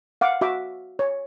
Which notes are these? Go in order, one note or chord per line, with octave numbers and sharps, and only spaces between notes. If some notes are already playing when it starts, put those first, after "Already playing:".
F5 F#5 D6
F#4 E5 D6
C#5